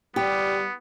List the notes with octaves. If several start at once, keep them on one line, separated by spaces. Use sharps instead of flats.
G3 B3 G4